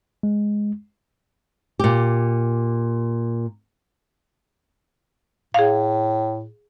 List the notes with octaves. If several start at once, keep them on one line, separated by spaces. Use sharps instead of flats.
G#3
A#2 G4
A2 G#4 F5